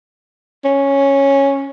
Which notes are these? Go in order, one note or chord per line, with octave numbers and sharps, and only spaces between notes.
C#4